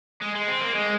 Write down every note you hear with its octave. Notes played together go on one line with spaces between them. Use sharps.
G#3
G#3
C4
A#3
G#3